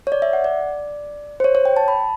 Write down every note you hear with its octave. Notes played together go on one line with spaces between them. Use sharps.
C#5
D5
E5
F#5
D5
C5
C#5
C#5
G5
A5
B5